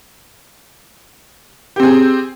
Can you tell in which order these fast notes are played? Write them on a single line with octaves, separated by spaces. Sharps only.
G4 C4 G#4